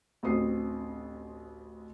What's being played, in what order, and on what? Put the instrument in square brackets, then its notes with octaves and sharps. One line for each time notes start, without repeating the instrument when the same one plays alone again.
[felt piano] A1 D2 C4 D#6 C7